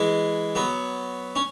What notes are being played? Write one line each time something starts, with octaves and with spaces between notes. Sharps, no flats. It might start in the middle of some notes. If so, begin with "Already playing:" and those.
Already playing: E3 G#3
F#3 B3
C#4